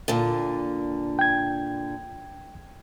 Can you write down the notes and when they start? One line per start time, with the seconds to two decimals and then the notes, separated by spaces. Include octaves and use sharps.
0.08 A#2 D3
1.19 G5 G#6